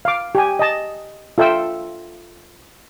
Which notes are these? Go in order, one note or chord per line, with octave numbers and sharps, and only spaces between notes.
F5 D6
G4 G#5
D#5 A5
F4 A4 E5 G5 E6